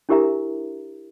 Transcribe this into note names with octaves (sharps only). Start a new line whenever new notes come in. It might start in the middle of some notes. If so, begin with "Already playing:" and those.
D4 E4 G4 A#4 E5 A#5